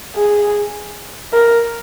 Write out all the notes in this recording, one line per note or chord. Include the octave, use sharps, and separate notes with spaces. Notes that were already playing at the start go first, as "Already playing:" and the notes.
G#4
A#4